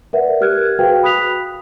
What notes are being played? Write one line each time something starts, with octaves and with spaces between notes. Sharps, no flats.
A#4 B4 D5 E5 F#5
G4 A#4 F6 F#6 G#6
F#4 G#4 B4 C5 F5 G5
B5 D#6 F#6 B6 F7